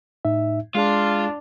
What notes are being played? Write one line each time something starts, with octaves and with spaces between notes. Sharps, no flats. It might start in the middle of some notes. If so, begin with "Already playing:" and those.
A2 D#4 E5
G#3 D4 F4 G#4